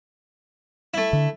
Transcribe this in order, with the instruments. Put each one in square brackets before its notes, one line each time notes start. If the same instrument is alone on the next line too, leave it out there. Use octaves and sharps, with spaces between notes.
[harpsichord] A3 E4
[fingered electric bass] D3